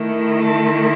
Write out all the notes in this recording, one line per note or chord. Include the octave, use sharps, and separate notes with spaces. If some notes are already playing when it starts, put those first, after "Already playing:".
Already playing: D#3 A3 E4
A5